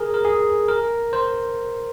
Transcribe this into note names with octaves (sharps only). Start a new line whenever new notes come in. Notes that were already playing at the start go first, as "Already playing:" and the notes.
Already playing: G#4 A#4
A#4
G#4
A#4
C5